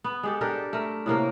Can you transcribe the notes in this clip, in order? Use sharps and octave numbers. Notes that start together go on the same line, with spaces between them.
B3
G#3 G4 A4
D4 G4 A4 A#4
A3 A#4
A2 C3 A#3 A#4